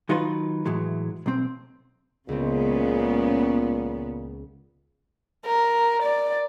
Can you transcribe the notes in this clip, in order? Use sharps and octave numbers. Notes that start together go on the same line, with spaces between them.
D#3 F#3 D#4 F4 B4 C6
A2 E3 F#3 G#3
B1 C4
C#2 A#2 C#3 G#3 B3 C4
A#4
D5